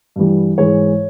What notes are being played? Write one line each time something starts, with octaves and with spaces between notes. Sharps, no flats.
G2 E3 G3
G#2 E3 G#3 C#5